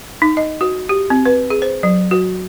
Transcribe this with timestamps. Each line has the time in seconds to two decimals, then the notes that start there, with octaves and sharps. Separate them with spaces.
0.22 D#4
0.37 D#5
0.61 F#4
0.89 G4
1.10 C4
1.26 B4
1.50 G#4
1.62 C5
1.83 F#3
2.11 F#4